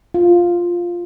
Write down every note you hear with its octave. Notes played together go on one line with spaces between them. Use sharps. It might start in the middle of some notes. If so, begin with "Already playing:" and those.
F4